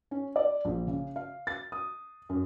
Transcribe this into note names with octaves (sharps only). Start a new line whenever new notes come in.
C#4
D5
A#1
C#3
F5
A6
D#6
F#2